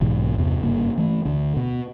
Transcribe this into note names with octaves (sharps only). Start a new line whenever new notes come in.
B1 G#2 B2 E3
E2 G2 C3 B3
F#1 G2 C#3 A#3
E3 A3
D2 D3
B2